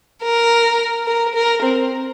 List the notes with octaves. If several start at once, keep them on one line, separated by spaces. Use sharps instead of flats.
A#4
A#4
A#4
C4